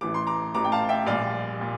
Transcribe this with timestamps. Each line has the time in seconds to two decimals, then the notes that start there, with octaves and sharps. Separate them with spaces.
0.01 A1 A2 E3 D6
0.14 C6
0.27 A#5 D6
0.54 A1 A2 E3 A#5 D6
0.64 G5
0.72 F5 A5
0.89 E5 G5
1.07 A#1 A#2 G3 D5 F5
1.60 A#2 G3